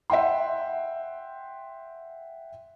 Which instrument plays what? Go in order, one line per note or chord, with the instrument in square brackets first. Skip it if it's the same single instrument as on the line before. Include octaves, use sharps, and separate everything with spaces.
[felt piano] E5 F#5 G5 C6